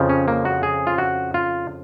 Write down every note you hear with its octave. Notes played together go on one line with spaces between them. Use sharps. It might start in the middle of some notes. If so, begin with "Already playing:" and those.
Already playing: F2 C#3 F3
C#4
A#3
F#4
G#4
F4
F#4
F4